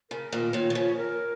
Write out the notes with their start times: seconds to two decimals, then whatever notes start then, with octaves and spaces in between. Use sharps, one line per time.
0.10 C#3 A#4
0.32 A#2 D#3
0.53 A#2 D#3 C#5
0.70 D#3
0.75 C#3 F3
0.97 A#4